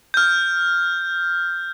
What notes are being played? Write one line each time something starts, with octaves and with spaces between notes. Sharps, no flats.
F6 G6